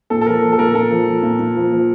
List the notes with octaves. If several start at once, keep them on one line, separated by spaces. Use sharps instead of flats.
A#2 A4
A4
F3 A#4
F3
A4
A#2 A#4
A#2 A4
F3
F3
A#2
A#2
F3
F3